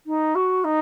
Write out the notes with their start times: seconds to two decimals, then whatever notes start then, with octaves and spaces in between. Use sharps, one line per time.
0.07 D#4
0.35 F#4
0.64 D#4